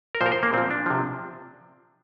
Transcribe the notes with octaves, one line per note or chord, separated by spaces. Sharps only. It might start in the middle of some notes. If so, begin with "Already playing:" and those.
A#4
A#2 F3 C5
A#4
C5
A#3
A#2 F3 C4
D4
C3 F3